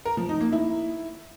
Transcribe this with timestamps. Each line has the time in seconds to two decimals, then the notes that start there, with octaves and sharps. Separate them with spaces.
0.05 A#4
0.17 F3
0.29 D#4
0.41 A#3
0.52 E4